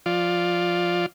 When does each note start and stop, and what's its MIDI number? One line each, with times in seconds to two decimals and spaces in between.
0.06 1.06 53
0.06 1.06 65
0.06 1.06 74